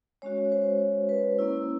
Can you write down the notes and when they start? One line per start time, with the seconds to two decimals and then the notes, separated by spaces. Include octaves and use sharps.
0.22 G#3 C#4 F#4 C#5
0.52 C5
1.09 B4
1.39 A#3 C#4 E4